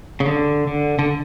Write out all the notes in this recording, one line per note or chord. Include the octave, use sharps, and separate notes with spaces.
C#3
D3
D3
D3